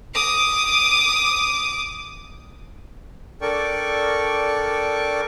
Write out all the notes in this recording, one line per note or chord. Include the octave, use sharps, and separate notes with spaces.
D6 D#6
D4 A4 A#4 D5 G5 C#6